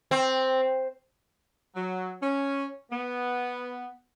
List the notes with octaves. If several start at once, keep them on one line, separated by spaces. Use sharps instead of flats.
C4
F#3
C#4
B3